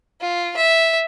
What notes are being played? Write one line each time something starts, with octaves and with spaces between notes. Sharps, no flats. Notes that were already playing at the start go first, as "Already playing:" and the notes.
F4
E5